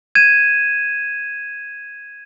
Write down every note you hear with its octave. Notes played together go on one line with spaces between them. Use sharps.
G#6 D#7 E7